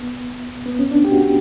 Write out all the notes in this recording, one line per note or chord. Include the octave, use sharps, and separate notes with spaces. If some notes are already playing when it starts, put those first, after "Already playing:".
Already playing: B3
B3
C#4
D4
G4
F#4
G4